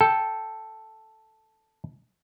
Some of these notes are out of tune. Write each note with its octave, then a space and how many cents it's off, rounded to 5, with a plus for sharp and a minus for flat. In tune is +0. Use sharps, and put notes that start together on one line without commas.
A4 +0 G5 +0